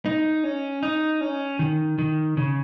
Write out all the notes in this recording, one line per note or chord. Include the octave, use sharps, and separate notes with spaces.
D#4
C#4
D#4
C#4
D#3
D#3
C#3